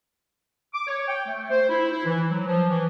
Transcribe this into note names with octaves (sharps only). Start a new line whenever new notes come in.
D6
C#5
G5
A3
C5
E4
E4
E3
F#3
F3
E3